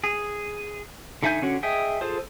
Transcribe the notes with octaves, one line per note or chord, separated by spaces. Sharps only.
G#4
D3 D#4 E5 G#5 G6
D3 C#4 F#4
G#4 D#5 E5 G5
F4 G#4 A4 C5